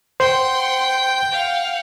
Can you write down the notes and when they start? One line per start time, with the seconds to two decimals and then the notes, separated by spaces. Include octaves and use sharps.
0.20 C5 F#5 G5 C6
1.32 F5 F#5